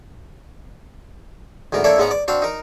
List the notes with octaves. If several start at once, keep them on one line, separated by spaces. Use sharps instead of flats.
D2 G#2 B3 A#4
A#3 D4 E4 A4 C#5 D5
G#2 G#3 B3 C#4 F#5 A#5
D5
C4 D4 F#4 F5
D#4 A#4